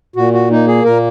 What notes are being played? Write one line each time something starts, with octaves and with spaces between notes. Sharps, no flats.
A#2 F#4
F#4
A#3 D#4
G#4
A#2 A#4